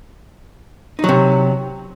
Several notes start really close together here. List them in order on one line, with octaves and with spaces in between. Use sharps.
D#4 F#3 C3